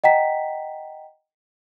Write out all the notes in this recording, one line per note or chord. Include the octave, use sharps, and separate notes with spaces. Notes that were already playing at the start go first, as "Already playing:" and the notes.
D#5 F#5 G5 A#5 B6